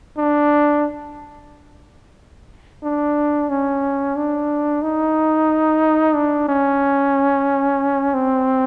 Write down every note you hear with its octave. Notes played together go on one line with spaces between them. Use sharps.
D4
D4
C#4
D4
D#4
D4
C#4
C4